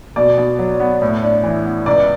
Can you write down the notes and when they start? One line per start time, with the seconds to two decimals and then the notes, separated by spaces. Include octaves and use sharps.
0.16 B2 D5
0.38 B2
0.59 F#3
0.80 B3
1.02 A2
1.23 D4
1.43 E3
1.65 B3
1.86 C#2 D5